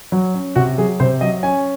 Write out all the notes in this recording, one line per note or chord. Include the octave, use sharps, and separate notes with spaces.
F#3
C#4
C3 F#4
F#3 G#4
C3 C5
F#3 D#5
C#4 G#5